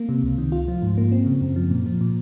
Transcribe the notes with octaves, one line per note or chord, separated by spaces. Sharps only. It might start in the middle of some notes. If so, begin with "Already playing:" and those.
Already playing: A#3
C3
C#2
D#3
F4
F3
G#2
A#3
C4
C#3
F#2
F3
A#2
F3
A#2